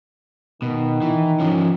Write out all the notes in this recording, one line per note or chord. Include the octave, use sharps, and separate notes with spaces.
B2 D#3
E3
F3 C#4